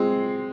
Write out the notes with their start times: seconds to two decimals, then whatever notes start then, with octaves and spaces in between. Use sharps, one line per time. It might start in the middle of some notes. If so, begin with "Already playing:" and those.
Already playing: G#3 C4